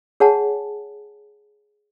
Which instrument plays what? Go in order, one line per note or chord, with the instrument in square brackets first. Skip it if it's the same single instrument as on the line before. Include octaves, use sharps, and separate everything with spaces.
[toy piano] G#4 C#5 F#5 G#5 A5